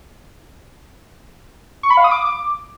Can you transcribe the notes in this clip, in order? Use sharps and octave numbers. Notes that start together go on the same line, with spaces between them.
C#6
B5
F5
D#6
D6